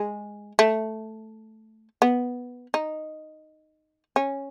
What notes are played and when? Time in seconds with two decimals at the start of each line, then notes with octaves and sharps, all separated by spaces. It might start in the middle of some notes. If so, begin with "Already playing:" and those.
Already playing: G#3
0.59 A3
2.02 B3
2.74 D#4
4.16 C#4